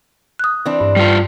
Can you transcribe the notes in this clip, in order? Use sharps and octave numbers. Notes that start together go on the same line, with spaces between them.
D#6 F#6
E3 C4 D4
G2
G3 F4